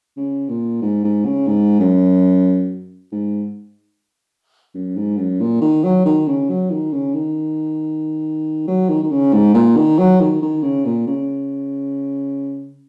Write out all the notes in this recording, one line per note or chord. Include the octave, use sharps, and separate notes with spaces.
C#3
A#2
G#2
G#2
C#3
G#2
F#2
G#2
F#2
G#2
F#2
A#2
D#3
F#3
D#3
C#3
F#3
D#3
C#3
D#3
F#3
D#3
D#3
C#3
G#2
A#2
D#3
F#3
D#3
D#3
C#3
A#2
C#3